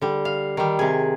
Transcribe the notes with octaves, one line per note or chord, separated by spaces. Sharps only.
D3 G3
F5
D#3 G3
C3 G#4